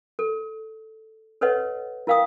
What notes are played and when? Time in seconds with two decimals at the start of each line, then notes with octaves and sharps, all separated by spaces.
0.19 A4
1.41 A4 B4 C#5 D#5 F#5
2.07 E4 A#4 F5 G5 D#6